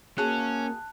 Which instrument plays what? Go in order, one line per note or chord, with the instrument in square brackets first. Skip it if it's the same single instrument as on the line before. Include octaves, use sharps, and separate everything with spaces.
[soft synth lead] A#3 [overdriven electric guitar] C#4 [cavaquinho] F#4 G#4 [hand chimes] A5 F#6